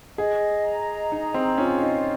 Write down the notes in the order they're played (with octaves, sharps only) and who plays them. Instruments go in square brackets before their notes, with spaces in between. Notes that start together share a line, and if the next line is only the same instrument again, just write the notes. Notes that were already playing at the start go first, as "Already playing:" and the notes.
[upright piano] G#4 [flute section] D#5
[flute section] A#5
[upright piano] D#4 [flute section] G#4
[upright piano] C4
[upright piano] C#4 [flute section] F4
[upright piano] D#4